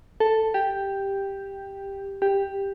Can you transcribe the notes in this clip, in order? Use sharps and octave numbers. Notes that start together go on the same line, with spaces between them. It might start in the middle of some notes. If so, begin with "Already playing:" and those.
A4
G4
G4